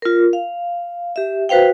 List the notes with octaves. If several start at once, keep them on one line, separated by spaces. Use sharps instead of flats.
F4 A#4
F5
G4 E5
F#4 B4 C5 F5 G5